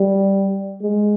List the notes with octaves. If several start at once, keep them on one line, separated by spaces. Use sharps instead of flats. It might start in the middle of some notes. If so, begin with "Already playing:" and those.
Already playing: G3
G#3